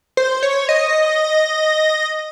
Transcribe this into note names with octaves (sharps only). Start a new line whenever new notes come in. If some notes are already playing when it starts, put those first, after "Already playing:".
C5
C#5
D#5